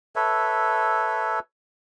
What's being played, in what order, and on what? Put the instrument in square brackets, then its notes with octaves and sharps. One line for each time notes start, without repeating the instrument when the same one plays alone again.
[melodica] A4 B4 C#5 E5